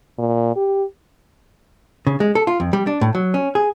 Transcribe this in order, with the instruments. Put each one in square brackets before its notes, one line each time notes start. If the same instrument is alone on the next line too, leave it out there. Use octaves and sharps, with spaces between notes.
[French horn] A#2
G4
[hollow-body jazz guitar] C#3
G#3
A4
F4
F2
G3
D4
A2
F#3
C#4
G#4